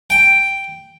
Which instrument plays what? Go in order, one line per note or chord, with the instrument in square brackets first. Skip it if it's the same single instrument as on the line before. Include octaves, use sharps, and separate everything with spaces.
[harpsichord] G5